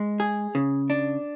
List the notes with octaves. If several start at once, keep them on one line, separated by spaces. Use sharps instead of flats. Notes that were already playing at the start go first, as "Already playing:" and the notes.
Already playing: G#3
G#4
C#3
D4